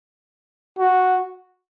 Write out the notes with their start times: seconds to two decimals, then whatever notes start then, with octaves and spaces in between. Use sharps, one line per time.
0.79 F#4